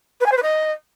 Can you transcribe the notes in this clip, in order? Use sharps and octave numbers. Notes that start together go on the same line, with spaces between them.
B4
G#5
C5
B4
D#5